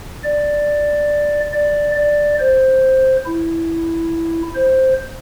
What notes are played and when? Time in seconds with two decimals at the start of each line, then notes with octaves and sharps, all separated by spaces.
0.23 D5
1.53 D5
1.95 D5
2.39 C5
3.26 E4
4.55 C5